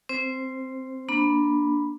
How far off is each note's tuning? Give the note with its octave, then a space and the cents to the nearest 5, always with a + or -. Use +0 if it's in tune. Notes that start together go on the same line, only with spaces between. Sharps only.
C4 +0 C5 +0
A#3 +20 D4 +0 B5 +0